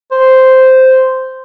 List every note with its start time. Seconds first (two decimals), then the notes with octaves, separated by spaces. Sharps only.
0.12 C5